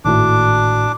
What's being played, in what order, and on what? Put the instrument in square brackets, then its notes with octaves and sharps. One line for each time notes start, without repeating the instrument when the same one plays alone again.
[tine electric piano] G#1 A2 F#4 [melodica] D4 D6